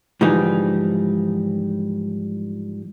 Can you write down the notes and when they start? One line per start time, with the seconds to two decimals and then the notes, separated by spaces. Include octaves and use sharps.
0.21 G#2 D3 E3 F3 G3 D#4